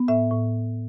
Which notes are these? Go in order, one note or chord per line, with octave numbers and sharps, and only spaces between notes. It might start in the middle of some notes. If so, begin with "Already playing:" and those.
Already playing: B3
A2 E5
A2